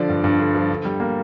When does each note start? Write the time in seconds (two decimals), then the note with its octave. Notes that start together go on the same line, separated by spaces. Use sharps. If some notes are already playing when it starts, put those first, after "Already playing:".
Already playing: D3 F3 D5
0.09 G2
0.24 G2
0.40 D3
0.55 F3
0.70 D3
0.85 G3
1.00 A#3